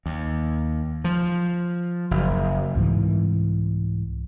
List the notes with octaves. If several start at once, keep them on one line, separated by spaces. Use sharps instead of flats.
D#2
F3
F#1
C2 G#2 E3